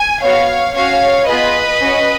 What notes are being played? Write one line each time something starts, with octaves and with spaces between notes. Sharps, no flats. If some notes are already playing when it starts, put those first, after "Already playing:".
Already playing: G#5
B3 F#4 C#5 F5
C#4 F#4 C#5 F5
B3 F4 G#4 B4 D#5
C#4 F#4